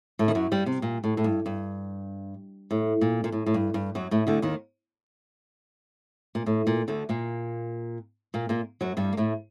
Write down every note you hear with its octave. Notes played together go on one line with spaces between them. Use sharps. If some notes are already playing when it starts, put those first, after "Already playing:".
A2 A3
D#3
F#2 F#3
G2 G3
C3
A#2
A2
A2
G2
G2
A2
A#2
A#2
A2
A2
G2
G2
F#2 F#3
A2 A3
D2 D3
D#2 D#3
A#2
A2
A#2
D2 D3
A#2 A#3
A#2 A#3
A#2 A#3
F#2 F#3
G2 G3
A#3
A2 A3